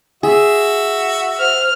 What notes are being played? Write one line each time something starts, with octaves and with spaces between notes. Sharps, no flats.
F#4 G#4 E5
C5 F6